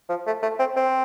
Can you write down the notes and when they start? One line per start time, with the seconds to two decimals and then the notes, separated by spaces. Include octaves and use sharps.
0.09 F3
0.27 A3
0.42 A3
0.59 C4
0.76 C4